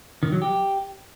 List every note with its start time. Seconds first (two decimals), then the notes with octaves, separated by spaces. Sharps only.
0.23 D#3
0.32 F#3
0.42 G4